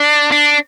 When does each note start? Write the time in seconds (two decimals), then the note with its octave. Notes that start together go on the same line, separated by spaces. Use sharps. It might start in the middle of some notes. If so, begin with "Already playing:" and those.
Already playing: D4
0.32 D4